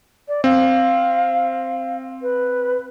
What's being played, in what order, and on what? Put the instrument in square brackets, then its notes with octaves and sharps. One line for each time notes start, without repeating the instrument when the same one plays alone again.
[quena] D5
[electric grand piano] C4 [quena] F5
[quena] B4